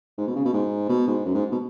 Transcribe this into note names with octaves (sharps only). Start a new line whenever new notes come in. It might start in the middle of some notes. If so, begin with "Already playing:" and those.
G#2
B2
C#3
B2
G#2
B2
G#2
F#2
G#2
B2